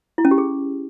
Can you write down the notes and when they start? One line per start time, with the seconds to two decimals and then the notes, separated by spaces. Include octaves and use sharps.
0.18 E4
0.25 C#4
0.31 G4
0.38 G#4